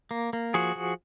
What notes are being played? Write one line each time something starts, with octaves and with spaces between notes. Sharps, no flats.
A#3
A#3
F3 F#4 G#4
F3